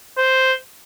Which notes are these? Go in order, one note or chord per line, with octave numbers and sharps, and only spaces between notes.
C5